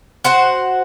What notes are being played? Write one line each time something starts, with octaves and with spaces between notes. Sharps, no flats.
F#4 C5 F#5